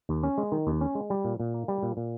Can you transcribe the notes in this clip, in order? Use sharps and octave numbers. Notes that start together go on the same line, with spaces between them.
D#2
C#4
G#3
D#3
D#2
C#4
G#3
G3
A#2
A#2
A#3
G3
A#2
A#2